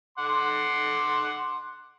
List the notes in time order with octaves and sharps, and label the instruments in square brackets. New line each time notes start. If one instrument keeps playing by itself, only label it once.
[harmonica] F#5 C6 D6